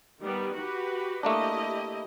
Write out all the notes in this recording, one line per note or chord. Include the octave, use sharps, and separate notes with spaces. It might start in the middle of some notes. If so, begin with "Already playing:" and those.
D#3 G3 B3
F#4 G4 B4
A3 A#3 D4 E4 G4 D#5